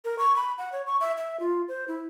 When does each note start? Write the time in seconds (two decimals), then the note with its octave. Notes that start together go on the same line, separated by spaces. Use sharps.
0.05 A#4
0.19 C#6
0.36 B5
0.58 F#5
0.72 C#5
0.87 C#6
1.01 E5
1.18 E5
1.40 F4
1.68 C5
1.88 E4